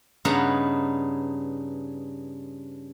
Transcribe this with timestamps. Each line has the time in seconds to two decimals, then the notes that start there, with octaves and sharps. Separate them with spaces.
0.25 G2 C#3 B3 D#4 F#5 A#5